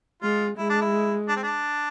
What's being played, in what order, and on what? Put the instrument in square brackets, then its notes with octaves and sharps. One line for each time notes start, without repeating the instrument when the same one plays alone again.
[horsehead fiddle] G#3 [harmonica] F4
[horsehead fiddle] G#3 [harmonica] E4
[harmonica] D4
E4
D4
C4
D4